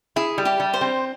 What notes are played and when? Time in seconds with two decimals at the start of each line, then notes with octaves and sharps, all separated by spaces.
0.16 E4 G#4
0.38 G3
0.45 G4
0.60 G3
0.74 C5
0.81 C4